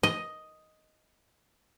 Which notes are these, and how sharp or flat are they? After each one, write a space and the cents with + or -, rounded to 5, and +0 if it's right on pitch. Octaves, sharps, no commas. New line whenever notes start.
D#5 +5